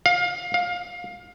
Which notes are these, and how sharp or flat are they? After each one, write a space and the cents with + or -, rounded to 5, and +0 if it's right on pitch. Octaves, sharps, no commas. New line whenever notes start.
F5 +25
F5 +25